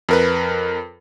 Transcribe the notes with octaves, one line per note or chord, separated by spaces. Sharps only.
F2 A#4 B4